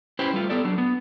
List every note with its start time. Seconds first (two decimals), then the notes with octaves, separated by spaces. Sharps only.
0.19 C#4 E4 G4 B4 C5
0.34 G3 A3 F4
0.50 B3 G4 A4 D5
0.65 F#3 D4
0.78 B3